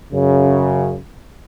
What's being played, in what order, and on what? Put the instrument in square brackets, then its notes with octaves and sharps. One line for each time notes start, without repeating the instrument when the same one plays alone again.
[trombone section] F#2 C#3